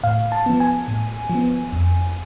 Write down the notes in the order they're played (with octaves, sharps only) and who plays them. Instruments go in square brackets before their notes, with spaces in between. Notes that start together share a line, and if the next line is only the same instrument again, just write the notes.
[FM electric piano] A2 F5
A5
F3 B3
G#5
A2
F3
B3
F2